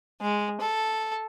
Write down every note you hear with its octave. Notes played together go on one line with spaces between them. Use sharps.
G#3
A4